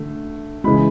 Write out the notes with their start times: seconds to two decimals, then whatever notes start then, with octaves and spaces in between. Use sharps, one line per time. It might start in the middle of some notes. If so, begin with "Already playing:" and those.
Already playing: D3 A3
0.64 C#3 E3 G#3 B5